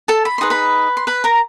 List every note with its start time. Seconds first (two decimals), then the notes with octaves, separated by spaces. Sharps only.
0.08 A4 A5
0.25 B5
0.38 D#4 G#4 B4 C6
0.50 B4 B5
0.97 C6
1.07 B4 B5
1.24 A#4 A#5